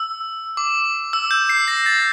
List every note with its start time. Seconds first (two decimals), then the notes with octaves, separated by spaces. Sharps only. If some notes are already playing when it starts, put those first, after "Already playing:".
Already playing: E6
0.57 D6
1.13 E6
1.31 G6
1.49 C7
1.68 A#6
1.86 A6